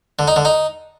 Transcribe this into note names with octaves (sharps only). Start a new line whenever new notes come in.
D3
D#4
D3
D#4